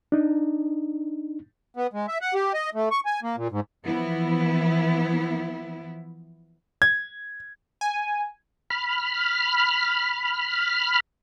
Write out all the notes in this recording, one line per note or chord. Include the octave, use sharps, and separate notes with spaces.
D4 D#4
B3
G#3
E5
F#5
G4
D#5
A3
C#6
G#5
A#3
A#2
G#2
E3 F3 B3 E4
G#6
G#5
B5 F6